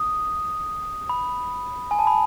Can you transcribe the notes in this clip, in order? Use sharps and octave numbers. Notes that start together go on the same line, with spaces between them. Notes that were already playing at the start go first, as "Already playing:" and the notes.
Already playing: D#6
B5
G#5
A5
B5